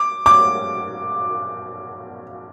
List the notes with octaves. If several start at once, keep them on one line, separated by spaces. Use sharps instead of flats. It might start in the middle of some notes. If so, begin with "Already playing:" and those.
Already playing: D6
D6